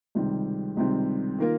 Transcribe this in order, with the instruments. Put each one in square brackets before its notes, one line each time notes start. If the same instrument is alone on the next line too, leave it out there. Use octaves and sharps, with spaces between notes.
[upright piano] C#2 C3 D#3 G3 C4
C#2 C3 D#3 G3 C4
D#3 A#3 F4 A#4